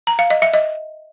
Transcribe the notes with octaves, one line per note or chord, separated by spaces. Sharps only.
A#5
F5
D#5
E5
D#5